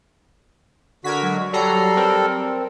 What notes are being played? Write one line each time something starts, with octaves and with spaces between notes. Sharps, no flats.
D3 F#4 A#4 G#6 B6
F#3 G#3
F#3 G3 A4 A#5 C7
C4 A#4